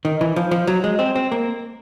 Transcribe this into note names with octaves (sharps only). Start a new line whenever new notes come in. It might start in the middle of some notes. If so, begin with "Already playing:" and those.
D#3
E3
F3
F3
F#3
G#3
C4
C4
A#3